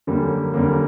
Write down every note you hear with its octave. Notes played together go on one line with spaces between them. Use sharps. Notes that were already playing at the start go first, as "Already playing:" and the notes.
F#2 D3 G3 A#3
F#2 D3 G3 A#3